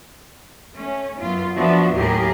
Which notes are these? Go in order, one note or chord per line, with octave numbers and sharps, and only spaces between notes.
A3 C#4
F#2 B3 F4
F3 B3 D4 F#4 D5 E5
D#2 A2 F#3 G4 G#4 A#4